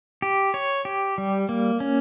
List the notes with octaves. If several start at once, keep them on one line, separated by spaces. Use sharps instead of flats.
G4
C#5
G4
G3
A#3
C#4